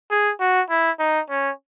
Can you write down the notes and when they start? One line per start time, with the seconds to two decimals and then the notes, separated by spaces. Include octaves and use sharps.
0.11 G#4
0.40 F#4
0.70 E4
0.99 D#4
1.30 C#4